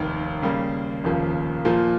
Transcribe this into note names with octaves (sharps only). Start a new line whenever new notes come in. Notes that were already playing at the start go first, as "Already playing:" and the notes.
Already playing: F1 D#2 D#3
C#3 G3 A#3
F1 D#2 C#3 F3 A#3
A#2 F3 A#3